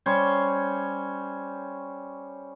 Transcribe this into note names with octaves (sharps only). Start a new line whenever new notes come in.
G3 C#4 C5 C#5